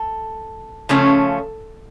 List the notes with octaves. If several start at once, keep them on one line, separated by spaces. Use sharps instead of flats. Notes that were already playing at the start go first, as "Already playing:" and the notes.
Already playing: A4
C#3 F3 A3 C#4